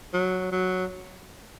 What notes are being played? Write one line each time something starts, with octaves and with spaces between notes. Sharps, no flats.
F#3
F#3